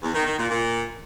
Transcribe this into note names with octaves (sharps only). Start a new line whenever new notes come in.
E2
D#3
D#3
A#2
A#2